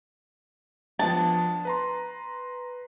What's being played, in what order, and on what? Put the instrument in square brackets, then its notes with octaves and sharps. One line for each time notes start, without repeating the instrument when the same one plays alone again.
[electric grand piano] F3 B3 D4 [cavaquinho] A5
[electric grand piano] B4 A#5 C6